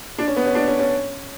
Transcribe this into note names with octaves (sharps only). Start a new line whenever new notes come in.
D4
C#4
B3
C#4
D4
C#4
C#4